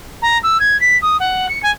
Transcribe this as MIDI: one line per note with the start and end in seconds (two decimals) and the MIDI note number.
0.22 0.38 82
0.43 0.58 88
0.60 0.79 92
0.81 0.98 95
1.02 1.17 87
1.20 1.47 78
1.49 1.62 97
1.63 1.71 80